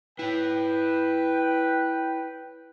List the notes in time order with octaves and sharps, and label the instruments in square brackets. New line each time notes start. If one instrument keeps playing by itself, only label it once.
[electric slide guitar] E4 C#5 [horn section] B4 G5